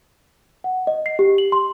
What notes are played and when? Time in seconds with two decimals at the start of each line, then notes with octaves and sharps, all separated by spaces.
0.64 F#5
0.87 D#5
1.06 C7
1.19 G4
1.38 F#7
1.52 C6